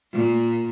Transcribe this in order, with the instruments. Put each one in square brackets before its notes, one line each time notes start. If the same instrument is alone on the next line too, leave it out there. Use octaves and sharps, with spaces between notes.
[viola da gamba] A#2